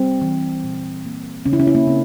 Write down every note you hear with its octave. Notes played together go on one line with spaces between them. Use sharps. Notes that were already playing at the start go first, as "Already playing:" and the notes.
Already playing: G3 C4
E3
A#2
A#3
C#3 C#4
E4
C#4
E4
A#3 C#4
C#3 C4